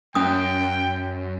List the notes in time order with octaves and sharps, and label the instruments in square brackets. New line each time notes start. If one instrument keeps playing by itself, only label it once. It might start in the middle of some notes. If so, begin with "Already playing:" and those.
[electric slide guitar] F#2 [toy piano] C#4 D#6 [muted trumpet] G5